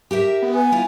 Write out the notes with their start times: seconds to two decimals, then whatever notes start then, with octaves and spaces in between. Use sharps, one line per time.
0.11 G4 A#4 E5
0.42 B3
0.54 G#5
0.72 E4 F4